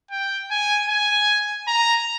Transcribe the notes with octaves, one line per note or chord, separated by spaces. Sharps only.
G5
G#5
G#5
A#5